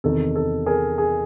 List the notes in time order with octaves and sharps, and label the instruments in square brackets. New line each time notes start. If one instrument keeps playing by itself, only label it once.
[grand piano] E2 C3 D#3 A4
A4
G#4 A#4
G#4